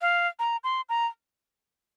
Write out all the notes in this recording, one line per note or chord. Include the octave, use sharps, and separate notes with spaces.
F5
A#5
C6
A#5